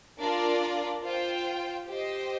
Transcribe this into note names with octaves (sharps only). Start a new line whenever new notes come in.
D4 F4 A#4 D5
F4 C5 G5
G4 C5 D#5